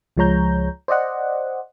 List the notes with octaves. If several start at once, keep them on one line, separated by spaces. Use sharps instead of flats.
C#2 F3 G#3 C#5 A#5 G6
C5 D5 D#5 F#5